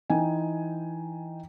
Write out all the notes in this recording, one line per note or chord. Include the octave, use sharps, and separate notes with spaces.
E3 D#4 G5 G#5